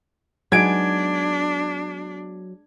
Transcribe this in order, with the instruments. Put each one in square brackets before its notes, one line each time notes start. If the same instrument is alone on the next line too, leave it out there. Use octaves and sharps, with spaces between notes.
[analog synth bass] F#3 [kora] G#3 B3 D#4 [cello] D4 [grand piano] G#6 D7